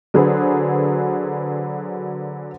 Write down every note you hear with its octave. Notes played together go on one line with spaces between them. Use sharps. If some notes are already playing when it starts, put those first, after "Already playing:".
D3 F#3 F#4 G#4 B4 C5